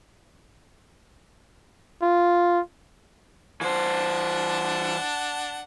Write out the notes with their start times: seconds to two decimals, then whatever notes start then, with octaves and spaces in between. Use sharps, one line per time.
2.02 F4
3.61 E3 D4 C5 F#5 A5